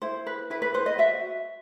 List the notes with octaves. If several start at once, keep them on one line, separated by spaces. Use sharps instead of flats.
E4 C5
B4
E4 B4
B4
B4 C5
D#5
F#4 E5